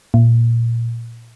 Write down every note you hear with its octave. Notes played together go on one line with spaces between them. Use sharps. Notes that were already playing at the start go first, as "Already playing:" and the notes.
A#2